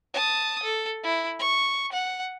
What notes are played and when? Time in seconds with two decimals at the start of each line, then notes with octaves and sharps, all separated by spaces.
0.14 A5 D#6
0.63 A4
1.04 E4
1.39 C#6
1.92 F#5